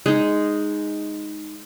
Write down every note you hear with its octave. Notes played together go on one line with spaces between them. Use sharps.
G#3 D#4